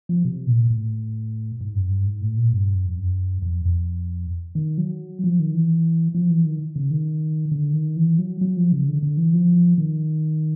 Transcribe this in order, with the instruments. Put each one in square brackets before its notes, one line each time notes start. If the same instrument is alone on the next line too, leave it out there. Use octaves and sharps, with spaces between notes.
[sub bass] F3
C3
A#2
A2
G#2
F#2
G2
G#2
A2
A#2
G2
F#2
F2
F#2
F2
F2
D#3
F#3
F3
D#3
E3
F3
E3
D#3
C#3
D#3
D3
D#3
E3
F#3
F#3
F3
C#3
D3
D3
E3
F3
D#3